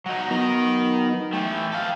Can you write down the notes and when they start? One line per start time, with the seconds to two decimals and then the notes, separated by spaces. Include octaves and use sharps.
0.06 F#3 D#4 F#5
0.31 F#3 B3 D#4 A#4 D#5
1.33 E3 A3 G5
1.72 A4 F5